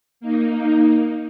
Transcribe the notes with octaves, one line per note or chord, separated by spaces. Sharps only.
A#3 D#4